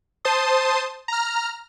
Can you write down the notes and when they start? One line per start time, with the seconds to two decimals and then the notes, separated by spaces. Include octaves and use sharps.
0.25 C5 A5 C6 D#6
1.08 A#5 F6